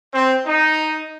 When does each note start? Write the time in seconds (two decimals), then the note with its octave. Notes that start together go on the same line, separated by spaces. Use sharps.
0.14 C4
0.46 D#4